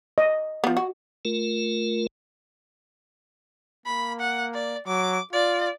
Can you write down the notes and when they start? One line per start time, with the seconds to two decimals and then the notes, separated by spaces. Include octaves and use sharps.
0.18 D#5
0.64 F3 B3
0.77 F#4
1.25 A3 F4 A#4
3.86 A#3 B5
4.20 F#5
4.54 D5
4.87 F#3 D6
5.33 F4 D5